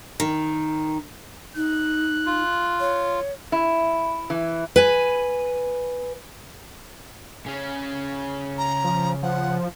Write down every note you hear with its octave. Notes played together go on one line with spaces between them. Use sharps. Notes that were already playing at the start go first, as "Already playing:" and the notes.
D#3
D#4 F#6
F4
C#5
E4
E3
B4 G#5
C#3 C#4
A#5
F3
F3 F#5